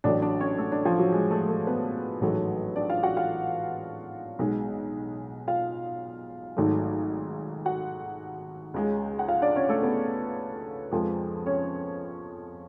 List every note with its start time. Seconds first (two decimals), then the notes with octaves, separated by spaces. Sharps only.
0.04 A1 A2 F#3 D4 D5
0.22 D4 D5
0.40 C#4 C#5
0.58 A3 A4
0.72 D4
0.85 F3 F4
0.99 F#3 F#4
1.12 G#3 G#4
1.31 A3 A4
1.49 A3 A4
1.67 B3 B4
2.21 A1 G#2 F#3 A3
2.76 D4 D5
2.89 F4 F5
3.03 F#4 F#5
3.16 F4 F5
4.39 B1 B2 G#3
5.48 F4 F5
6.57 G#1 G#2 F#3 A3
7.65 F#4 F#5
8.74 C#2 C#3 G#3
9.19 F#5
9.28 F4 F5
9.42 D4 D5
9.56 C#4 C#5
9.69 A3 A4
9.83 B3 B4
10.91 F2 F3 G#3
11.46 C#4 C#5